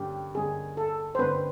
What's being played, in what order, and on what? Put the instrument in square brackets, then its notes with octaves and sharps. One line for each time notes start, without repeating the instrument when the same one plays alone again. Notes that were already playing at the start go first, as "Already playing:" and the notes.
Already playing: [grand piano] G2 D3 G3 A#3 C#4 [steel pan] G4
[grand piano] G2 D3 G3 A#3 C#4 [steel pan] G#4
[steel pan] A4
C5
[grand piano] G2 D3 G3 A#3 C#4 [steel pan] B4